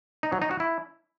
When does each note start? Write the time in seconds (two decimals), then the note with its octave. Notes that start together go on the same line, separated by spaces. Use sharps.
0.23 D#4
0.32 F#3
0.42 D#4
0.51 F#4
0.60 E4